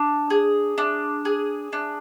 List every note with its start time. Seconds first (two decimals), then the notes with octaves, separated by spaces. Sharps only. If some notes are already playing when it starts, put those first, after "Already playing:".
Already playing: D4
0.30 G#4
0.78 D4
1.25 G#4
1.73 D4